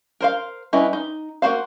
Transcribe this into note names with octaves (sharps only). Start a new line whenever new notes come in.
A#4 C5 F5
G3 C#4 E4 B4 D#5
D#4
A#3 E4 F#4 C5 F5